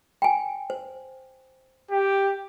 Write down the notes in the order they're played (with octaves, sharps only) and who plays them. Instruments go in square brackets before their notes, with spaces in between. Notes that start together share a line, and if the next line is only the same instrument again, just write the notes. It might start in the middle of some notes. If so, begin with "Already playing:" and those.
[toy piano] G5 G#5
C5
[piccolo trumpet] G4